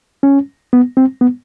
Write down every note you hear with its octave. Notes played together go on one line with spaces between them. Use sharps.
C#4
B3
C4
B3